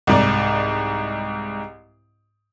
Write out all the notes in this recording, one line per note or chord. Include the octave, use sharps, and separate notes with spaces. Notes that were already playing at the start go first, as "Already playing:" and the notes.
C2 G#2 D5